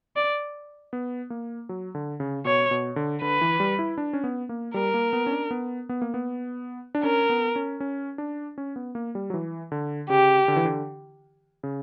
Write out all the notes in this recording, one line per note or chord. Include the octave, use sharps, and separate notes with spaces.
D5
B3
A#3
F#3
D3
C#3
B2 C#5
B2
D3
D3 B4
E3
G3
E4
D4
C#4
B3
A#3
G3 A#4
A#3
B3
C#4
D4
B3
B3
A#3
B3
D4
C#4 A#4
B3
C#4
C#4
D4
C#4
B3
A#3
G3
F#3
E3
D3
C#3 G4
D3
E3
D3
C#3